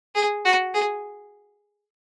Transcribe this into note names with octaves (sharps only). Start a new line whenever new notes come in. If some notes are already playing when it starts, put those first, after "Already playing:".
G#4
F#4
G#4